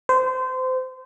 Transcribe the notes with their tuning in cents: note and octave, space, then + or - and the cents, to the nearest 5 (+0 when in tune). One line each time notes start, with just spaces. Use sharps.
C5 -25